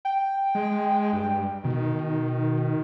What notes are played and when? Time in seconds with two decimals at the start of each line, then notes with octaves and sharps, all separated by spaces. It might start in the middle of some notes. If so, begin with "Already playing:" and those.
0.05 G5
0.55 G#3
1.13 G2
1.64 B2 D#3